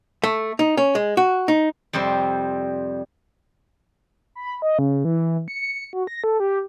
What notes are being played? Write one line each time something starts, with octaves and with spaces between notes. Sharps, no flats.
A3
D#4
C#4
G#3
F#4
D#4
F2 C3 G3 C5
B5
D#5
C#3
E3
C#7
F#4
A#6
A4
G4